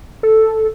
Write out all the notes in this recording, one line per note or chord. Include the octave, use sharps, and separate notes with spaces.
A4